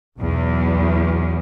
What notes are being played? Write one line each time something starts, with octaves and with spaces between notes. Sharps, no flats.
B1 E2